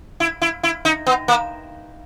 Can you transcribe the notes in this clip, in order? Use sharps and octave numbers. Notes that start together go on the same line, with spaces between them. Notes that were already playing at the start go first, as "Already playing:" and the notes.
E4
E4
E4
D#4
B3
A#3